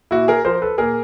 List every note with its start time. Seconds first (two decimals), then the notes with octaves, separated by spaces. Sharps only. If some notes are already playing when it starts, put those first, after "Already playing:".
0.11 A#2 E4 F#4
0.28 G#4 A#4
0.45 F3 A#4 C5
0.62 A4 B4
0.78 A#2 G#4 A#4